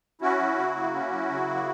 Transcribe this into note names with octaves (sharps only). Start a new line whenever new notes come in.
C#4 E4 F#4
F#3
C#3
A#3
C#4
F#3
C#3
A#3